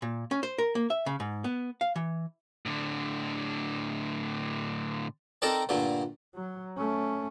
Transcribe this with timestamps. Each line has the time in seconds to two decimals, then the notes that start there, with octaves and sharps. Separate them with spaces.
0.02 A#2
0.31 C#4
0.43 C5
0.58 A#4
0.75 A#3
0.90 E5
1.06 C#3
1.20 G#2
1.44 B3
1.81 F5
1.96 E3
2.66 A2 D3
5.42 C4 D#4 A4 A#4 D5 A5
5.69 G2 A#2 D3 A3
6.35 F#3
6.78 A3 C#4